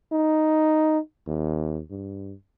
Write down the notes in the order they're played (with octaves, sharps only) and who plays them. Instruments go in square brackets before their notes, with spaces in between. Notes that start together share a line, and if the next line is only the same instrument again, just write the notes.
[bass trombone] D#4
D#2
G2